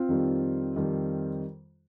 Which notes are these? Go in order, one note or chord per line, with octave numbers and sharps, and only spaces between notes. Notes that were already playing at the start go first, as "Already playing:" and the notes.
Already playing: C4 F4
F2 D#3 G3
F2 D#3 G3